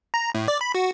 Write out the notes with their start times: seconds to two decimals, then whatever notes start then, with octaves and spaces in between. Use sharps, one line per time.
0.14 A#5
0.35 A2
0.48 D5
0.61 B5
0.75 F#4